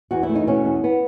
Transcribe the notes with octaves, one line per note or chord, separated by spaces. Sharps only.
E2 F#4
E4
A3
D#4
B2 C#4
E2
B3